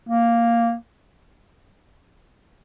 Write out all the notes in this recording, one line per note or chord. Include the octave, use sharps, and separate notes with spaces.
A#3